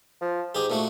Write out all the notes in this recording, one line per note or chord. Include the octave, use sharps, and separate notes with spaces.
F3
G#2 G4 G#4
A#2 A3 F#4